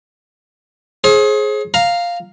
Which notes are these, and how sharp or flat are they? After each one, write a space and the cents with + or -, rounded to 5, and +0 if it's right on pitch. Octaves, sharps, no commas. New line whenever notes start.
G#4 +20 C5 +40
F5 +0 A#5 -10